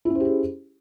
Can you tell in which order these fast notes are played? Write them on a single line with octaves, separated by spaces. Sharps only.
E4 C#4 C5 G4 G#4